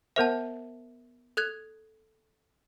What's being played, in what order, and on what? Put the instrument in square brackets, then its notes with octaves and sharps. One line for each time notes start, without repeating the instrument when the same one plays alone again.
[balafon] B3 A#4 C5 [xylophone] E5 A5
[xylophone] A4 F#6 G#6